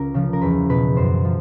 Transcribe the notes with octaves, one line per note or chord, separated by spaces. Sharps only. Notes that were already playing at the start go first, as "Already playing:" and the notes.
Already playing: C#2 A#4
C#3 F3
A#4
E2 B4
B2 B4
F#2 C5
F3